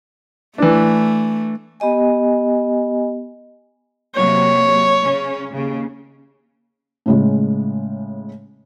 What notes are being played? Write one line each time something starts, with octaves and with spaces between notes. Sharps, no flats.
E3 A3 D4
B3 G4 D#5 G#5
C3 F#3 A#3 C#5
C#3 C#4
D#2 C#3
A2 C#3 G#3